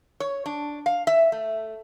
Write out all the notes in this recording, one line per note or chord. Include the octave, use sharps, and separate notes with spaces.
C#5
D4
F5
E5
A3